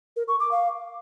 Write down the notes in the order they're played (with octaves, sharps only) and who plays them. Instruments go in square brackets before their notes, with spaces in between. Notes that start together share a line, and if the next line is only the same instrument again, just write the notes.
[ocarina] A#4
C#6
D6
F5